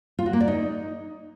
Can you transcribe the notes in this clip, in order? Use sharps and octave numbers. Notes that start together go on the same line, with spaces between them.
F4
F#4
A#3
D5
D#4